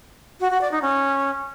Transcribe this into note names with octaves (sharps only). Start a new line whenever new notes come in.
F#4
F#4
D5
D#4
C#4